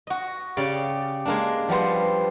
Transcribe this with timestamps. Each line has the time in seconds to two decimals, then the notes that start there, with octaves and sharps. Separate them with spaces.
0.07 F#4 D#5
0.57 C#3 G4 D5
1.25 G#3 A#3 D4
1.68 F3 G3 B3 C5